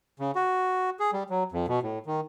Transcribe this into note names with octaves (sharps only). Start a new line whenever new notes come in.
C#3
F#4
G#4
G3
F#3
F2
B2
A2
D#3